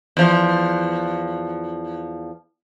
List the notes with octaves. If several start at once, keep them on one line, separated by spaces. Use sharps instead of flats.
E2 F3